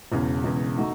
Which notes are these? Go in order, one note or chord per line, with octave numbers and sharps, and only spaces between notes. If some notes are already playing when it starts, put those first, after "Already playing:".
E1 E2 C#3
E1 E2 C#3
A3 D#4 F#4